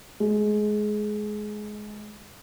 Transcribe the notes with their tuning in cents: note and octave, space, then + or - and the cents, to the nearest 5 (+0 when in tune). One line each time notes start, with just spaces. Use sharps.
G#3 +20